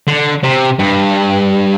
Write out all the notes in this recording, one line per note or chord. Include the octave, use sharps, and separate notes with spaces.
D3
C3
G2